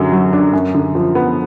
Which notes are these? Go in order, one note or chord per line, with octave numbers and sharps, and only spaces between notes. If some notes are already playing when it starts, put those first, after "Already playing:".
Already playing: F#2 D3 F#3
F#3
D4
F#2
D3
F3
B3